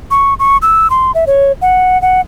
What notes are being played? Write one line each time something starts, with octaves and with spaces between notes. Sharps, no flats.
C#6
C#6
E6
C6
E5
C#5
F#5
F#5